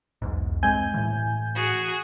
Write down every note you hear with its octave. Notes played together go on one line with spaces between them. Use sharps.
B1 E2 G#2
G2 G#3 C4 G#5 G6
A2 E3
F#4 G#4